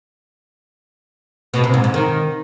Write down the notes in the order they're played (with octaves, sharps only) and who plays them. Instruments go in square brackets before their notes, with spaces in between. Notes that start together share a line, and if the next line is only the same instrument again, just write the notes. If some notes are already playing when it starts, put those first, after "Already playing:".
[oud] B2
C3
G#2
G#2
D#3